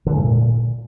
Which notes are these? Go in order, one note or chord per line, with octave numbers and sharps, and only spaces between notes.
D3
G#3
A2
A#2